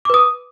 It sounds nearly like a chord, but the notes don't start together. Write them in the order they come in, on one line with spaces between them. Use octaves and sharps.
D6 B4 D#6